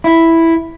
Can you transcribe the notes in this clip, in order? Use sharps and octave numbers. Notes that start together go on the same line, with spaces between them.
E4